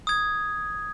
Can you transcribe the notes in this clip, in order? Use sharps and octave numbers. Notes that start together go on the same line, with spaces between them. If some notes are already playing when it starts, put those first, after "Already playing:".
D#6 G#6